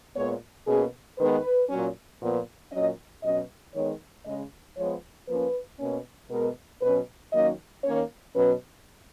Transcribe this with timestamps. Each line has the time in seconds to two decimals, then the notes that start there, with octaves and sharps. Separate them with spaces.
0.16 A#2 G#3 B3 C#5
0.67 B2 A#3 C#4 G#4
1.18 D#3 G#3 B3 B4
1.69 A#2 F#3 C#4
2.21 A#2 F3 B3
2.72 A#2 F#3 C#4 D#5
3.24 B2 F#3 C#4 D#5
3.74 D#3 G#3 B3 C#5
4.26 C#3 G#3 C#4 D#5
4.77 F3 G#3 B3 C#5
5.28 F3 A#3 C#4 B4
5.80 B2 A#3 C#4
6.30 B2 G#3 B3 A#4
6.82 B2 F#3 C#4 B4
7.33 D#3 F#3 A#3 C#4 D#5
7.84 D#3 A#3 C#4 C#5
8.35 B2 F#3 C#4 B4